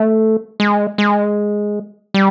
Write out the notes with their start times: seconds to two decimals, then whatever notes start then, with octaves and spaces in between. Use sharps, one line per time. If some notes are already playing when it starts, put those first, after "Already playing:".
Already playing: A3
0.60 G#3
0.98 G#3
2.14 G3